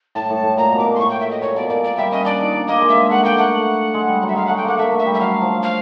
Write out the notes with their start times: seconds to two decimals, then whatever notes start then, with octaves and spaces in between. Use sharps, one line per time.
0.15 A2 A5
0.30 A2
0.43 A2
0.57 A#2 A#5
0.72 B2
0.79 D6
0.85 A#2
0.95 C6
0.99 A2 C#6
1.10 G5
1.20 E5
1.31 D#5
1.42 A#2 C#5
1.56 B2 D5
1.70 A#2 D5
1.84 D5
1.97 G3 E5
2.11 C#4 D#5
2.25 D4 D5
2.40 D#4
2.54 D4
2.67 A#3 D#5
2.81 G#3
2.89 E5
2.95 G#3
3.10 A3 F#5
3.23 A#3 G5
3.38 A3 F#5
3.94 G#3
4.08 G3
4.23 F#3
4.28 E5
4.36 G#3 F5
4.46 A3 F#5
4.57 G5
4.65 A#3 F#5
4.78 A3 E5
4.92 A3
4.99 E5
5.06 G3
5.14 E5
5.20 F#3 F5
5.41 F3
5.62 F5